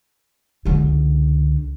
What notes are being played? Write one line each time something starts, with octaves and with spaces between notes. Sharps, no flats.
C#2 D3